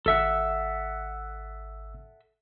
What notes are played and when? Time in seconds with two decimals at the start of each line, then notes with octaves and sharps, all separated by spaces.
0.06 G#1 A4 E5 F#5 E6